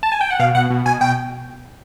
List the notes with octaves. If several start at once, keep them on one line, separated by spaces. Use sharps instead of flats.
A5
G#5
G5
F#5
B2 F5
B2 F#5
B2
B2 G#5
B2 G5